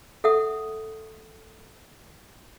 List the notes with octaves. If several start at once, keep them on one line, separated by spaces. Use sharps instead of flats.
A4 E5 F#5 D#6